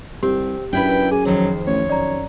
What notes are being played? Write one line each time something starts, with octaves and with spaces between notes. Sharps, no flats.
C2 C4 G4
F#2 D4 E4 B4 G5
G#4 G#5
F2 D#3 F#3 C5
A1 C#5
F#2 D5 A#5